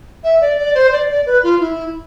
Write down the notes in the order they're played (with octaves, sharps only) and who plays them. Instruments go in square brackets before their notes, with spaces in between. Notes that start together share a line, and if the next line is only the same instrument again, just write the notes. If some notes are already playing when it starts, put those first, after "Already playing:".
[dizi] E5
D5
D5
C5
D5
D5
B4
F4
E4